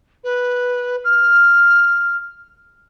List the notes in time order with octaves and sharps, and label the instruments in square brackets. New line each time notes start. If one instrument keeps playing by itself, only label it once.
[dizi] B4
F6